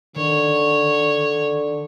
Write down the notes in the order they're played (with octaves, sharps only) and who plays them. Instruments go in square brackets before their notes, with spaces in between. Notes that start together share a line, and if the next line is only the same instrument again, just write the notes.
[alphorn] D3 [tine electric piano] D#3 [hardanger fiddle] C#5